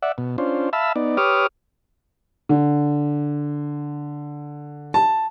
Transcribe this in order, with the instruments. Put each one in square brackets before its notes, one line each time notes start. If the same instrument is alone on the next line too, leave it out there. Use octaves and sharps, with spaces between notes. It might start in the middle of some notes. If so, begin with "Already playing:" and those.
[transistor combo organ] D5 E5 F#5
B2
C#4 D4 F4 C5
E5 F5 A5 B5 E6
B3 D#4 D5
G4 B4 C#5 D6 D#6 F6
[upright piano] D3
A5